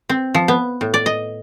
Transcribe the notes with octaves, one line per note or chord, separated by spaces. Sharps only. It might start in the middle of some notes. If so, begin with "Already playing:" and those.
C4
F3
B3
A2
D5
D#5